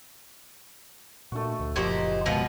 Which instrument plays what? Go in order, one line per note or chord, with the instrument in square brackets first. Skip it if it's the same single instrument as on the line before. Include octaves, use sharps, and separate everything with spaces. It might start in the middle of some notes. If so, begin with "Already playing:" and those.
[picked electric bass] A#2 D4 [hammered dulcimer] A3 F#4
[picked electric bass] D2
[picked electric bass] F#1 F3 [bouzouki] A#2 G4 C5 [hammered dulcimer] D#5 F#5 A#5
[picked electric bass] D#2 G#3 [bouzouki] B2 F3 B3